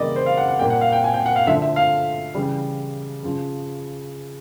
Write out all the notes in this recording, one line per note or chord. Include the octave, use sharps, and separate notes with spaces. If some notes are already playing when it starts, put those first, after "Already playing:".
Already playing: C#3 E3 G3 A#3 D5 D#5
C5
F5
F#5
F#5
A#2 G3 A#3 G5
F#5
F5
G5
G#5
G5
F#5
F5
D3 F3 A3 E5
E5
F5
C#3 E3 G3
C#3 F3